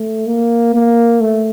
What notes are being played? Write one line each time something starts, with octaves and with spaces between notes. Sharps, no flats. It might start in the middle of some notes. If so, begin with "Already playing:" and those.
Already playing: A3
A#3
A#3
A3